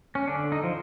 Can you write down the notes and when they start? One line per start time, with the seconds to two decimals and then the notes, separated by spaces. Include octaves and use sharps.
0.15 C#4
0.28 D3 D4
0.52 D#4
0.64 F3